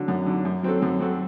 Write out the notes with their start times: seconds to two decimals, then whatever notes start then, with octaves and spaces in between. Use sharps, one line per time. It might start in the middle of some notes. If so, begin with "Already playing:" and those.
Already playing: D3 F#3
0.08 F#2
0.26 D3 F#3
0.45 F#2
0.63 F#3 C4 F#4 A4
0.82 F#2
1.00 F#3 C4 F#4 A4